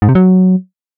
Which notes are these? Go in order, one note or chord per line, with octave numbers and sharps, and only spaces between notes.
G#2
C3
F#3